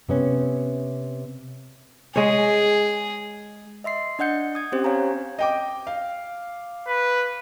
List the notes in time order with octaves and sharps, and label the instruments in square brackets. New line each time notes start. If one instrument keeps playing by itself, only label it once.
[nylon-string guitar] C3 B3 C#4
[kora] G#3 C#5 [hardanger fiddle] G#4
[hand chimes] D#5 E5 C6 C7
D4 D#5 F#5 G6 C#7
D#6 G#6
C4 C#4 G4 C5
C#5 F5 G#5 A#5
[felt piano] D#5 G5 D6
F5
[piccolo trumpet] B4